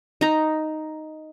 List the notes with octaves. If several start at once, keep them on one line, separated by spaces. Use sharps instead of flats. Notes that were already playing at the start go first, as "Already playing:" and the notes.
D#4 A#5